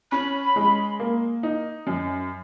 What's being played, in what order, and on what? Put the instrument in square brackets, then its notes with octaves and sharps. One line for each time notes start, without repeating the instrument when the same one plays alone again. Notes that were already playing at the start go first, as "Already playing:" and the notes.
[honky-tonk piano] C#4 [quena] B5
[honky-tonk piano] G#3
A#3
D#4
F#2